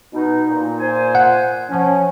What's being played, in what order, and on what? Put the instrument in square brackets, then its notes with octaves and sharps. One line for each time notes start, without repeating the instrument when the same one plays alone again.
[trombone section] B2 [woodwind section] D#4
[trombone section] A#2
[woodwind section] C5 G#5
[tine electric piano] F#5
[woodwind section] F3 [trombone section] C#4